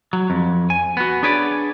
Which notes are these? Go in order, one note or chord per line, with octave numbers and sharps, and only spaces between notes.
F#3
F2
G#5
B3 F#4
D4 G#4 B4 C#5 D5